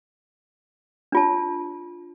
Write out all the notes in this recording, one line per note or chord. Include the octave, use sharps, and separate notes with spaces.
D4 F4 A5